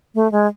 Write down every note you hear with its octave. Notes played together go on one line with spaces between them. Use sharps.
A3
G#3